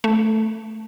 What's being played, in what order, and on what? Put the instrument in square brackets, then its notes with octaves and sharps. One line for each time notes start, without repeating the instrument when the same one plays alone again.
[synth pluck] A3